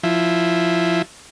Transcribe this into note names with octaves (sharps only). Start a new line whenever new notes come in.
F3 E4